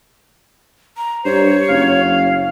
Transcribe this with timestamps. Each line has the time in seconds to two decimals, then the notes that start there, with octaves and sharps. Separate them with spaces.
0.97 A#5
1.25 G2 C5 C#5
1.69 F#1 F5